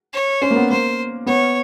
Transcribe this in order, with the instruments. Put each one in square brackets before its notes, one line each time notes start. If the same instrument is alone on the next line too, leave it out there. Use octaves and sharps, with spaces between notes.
[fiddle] C#5
[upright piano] C#4 [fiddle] C5
[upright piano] A#3
B3
[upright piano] A#3 [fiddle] C5
[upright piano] B3 [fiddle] C#5